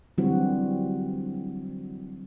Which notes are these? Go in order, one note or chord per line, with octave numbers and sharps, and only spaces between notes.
D3 E3 F#3 G3 C4 F#4